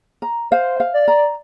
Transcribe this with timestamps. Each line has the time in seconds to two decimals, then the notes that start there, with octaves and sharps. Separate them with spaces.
0.22 A#5
0.51 C5 F5
0.80 F5
0.94 D5
1.08 A#5